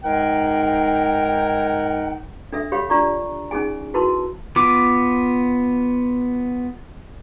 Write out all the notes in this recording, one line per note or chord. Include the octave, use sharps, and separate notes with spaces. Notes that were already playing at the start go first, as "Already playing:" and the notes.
G#2 G#3 D#4 A#4 F#5 G5
D4 A4 E5
G4 C#5 F5 B5
D4 F4 D5 A#5 C#6
C#4 D#4 G#4 G#5
E4 F#4 A#4 B4 A5 C6
B3 F4 D6